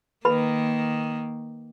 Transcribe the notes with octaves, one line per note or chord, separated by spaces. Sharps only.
D#3 A#3 B4 B5